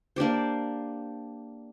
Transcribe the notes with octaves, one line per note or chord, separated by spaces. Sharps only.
A#3 D4 G4 C5